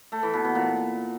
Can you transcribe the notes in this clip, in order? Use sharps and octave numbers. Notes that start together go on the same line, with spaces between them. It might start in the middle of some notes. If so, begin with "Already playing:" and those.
A3
E3
B2
B2
A#2